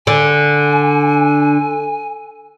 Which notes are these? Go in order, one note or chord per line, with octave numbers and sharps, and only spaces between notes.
D3 G#5